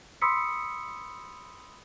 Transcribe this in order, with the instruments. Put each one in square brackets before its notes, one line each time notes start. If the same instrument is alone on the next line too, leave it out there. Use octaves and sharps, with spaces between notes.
[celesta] B5 C6 D#6 E6 B6 C#7